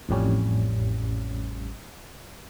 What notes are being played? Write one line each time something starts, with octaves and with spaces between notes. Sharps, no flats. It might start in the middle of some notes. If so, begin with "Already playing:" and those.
A1 F2 A2 G3 C#4